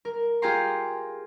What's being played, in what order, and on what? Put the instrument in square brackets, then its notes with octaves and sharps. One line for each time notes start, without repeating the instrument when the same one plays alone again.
[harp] A#4
F4 G4 G#4 G5 A#5 C6